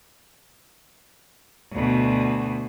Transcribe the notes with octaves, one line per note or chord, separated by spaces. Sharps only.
D2 B2